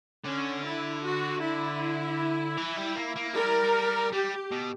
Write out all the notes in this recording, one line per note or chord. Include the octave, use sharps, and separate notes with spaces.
D3 C#4
E4
F#4
E4
E3
G3
A#3
A#3
G3 A#4
G3 G4
B2